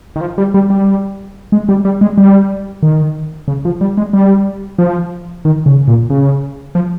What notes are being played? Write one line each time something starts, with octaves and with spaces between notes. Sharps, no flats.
D#3
F3
G3
G3
G3
G#3
G3
G3
G#3
G3
D#3
C#3
F3
G3
G#3
G3
F3
D#3
C#3
A#2
C#3
F3